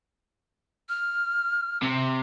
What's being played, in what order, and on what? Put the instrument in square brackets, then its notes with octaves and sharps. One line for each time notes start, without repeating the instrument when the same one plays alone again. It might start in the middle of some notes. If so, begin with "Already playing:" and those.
[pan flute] F6
[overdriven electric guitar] C3